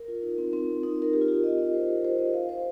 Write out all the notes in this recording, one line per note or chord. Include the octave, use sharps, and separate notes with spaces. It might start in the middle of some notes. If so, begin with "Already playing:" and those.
Already playing: A#4
F4
D#4
C4
C4
D#4
A#4
G4
F4
G4
D#5
D#5
C5
A#4
C5
D#5
F5
C5